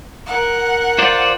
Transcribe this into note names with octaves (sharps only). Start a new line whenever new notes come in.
A#4 F#5
F4 C5 D5